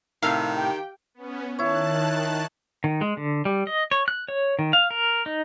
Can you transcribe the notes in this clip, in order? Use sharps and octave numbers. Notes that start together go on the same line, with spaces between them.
A2 C3 D#3 F5
G4 G5
B3 C#4
D#3 E4 C#5 A5 F#6
D#3
G#3
D3
G3
D#5
C#5
F#6
C#5
D#3
F5
A#4
D#4